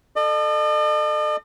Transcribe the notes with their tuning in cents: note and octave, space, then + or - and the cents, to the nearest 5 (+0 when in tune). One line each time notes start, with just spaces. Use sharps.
A4 +0 D#5 -45